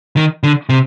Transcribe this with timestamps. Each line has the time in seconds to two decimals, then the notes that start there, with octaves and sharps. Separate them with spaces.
0.16 D#3
0.43 D3
0.69 C3